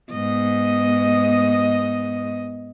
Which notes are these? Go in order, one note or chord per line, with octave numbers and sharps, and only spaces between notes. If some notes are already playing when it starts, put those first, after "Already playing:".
G#2 B3 D#5